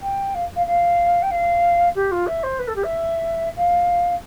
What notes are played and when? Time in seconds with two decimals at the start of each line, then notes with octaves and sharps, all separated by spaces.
0.01 G5
0.34 F5
0.55 F5
0.66 F5
1.22 G5
1.30 F5
1.95 G4
2.11 F4
2.26 E5
2.43 C5
2.58 B4
2.67 A4
2.75 G4
2.83 E5
3.56 F5